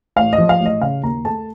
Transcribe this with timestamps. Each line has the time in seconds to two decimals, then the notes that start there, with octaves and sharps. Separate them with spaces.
0.16 A1 F5
0.33 D#5
0.38 F3
0.49 F5
0.60 A1
0.66 D#5
0.81 C#3 F5
1.03 D#2 A#5
1.25 A3 A5